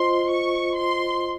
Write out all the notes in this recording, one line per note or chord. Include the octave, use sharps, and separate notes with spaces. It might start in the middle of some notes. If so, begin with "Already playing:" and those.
Already playing: F4 C5 D#5 C6
C#6
C6